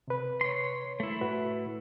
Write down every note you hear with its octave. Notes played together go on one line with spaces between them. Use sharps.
C3 B4
C#5 C6
A3 E4
A2 F#4 B4